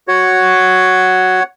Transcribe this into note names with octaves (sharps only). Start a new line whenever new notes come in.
F#4 C#5 F#5